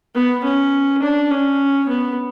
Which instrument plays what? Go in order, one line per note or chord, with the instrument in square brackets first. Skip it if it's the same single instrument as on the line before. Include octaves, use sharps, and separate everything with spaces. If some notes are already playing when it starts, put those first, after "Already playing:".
[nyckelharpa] B3
C#4
D4
C#4
B3